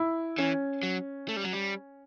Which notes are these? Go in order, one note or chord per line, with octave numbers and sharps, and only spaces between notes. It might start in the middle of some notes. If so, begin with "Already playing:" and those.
Already playing: E4
E3 C#4
F#3
A3
G3
F#3
G3